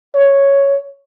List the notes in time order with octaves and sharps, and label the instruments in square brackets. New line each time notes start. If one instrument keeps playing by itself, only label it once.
[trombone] C#5